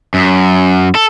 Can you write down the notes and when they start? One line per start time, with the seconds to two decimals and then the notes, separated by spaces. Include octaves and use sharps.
0.14 F#2
0.95 A4